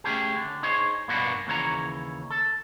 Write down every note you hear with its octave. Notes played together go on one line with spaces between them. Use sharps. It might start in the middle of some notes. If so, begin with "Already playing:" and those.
A3 C#4 G4 G#4
D3
D#4 G#4 C5 C#5
G2 B2 A#3 B3 D4 F#4
D#2 C#3 E3 C#5 A#5
A4